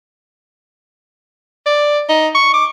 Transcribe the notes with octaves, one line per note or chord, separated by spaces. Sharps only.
D5
D#4
C#6
D6